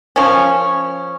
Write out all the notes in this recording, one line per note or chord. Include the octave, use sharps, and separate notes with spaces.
F3 C#4